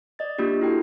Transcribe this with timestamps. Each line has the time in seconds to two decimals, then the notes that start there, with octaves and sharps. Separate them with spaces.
0.19 D5 D#5 A6
0.38 A#3 D4 F4 G4
0.61 E4 F#4 A4 G5